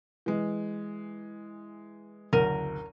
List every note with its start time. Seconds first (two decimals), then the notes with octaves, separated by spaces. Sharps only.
0.26 E3 G#3
2.33 F#1 D2 A#4 D#7